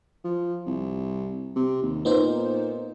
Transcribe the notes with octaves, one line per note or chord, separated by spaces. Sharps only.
F3
C2
C3
D#2
A#2 B3 D#4 C5